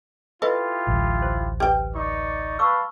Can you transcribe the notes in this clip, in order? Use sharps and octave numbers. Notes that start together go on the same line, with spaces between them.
E4 F4 G4 A4 B4 D#5
D1 A1
C5
G4 B4 G5
D#4 D5 C#6
B4 F5 A5 C#6 D6 E6